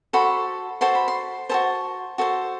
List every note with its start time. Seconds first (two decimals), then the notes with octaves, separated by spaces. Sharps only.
0.13 F#4 A4 C5 B5
0.81 F#4 A4 C5 C6
0.95 B5
1.08 C6
1.49 F#4 A4 C5 A5
2.18 F#4 A4 C5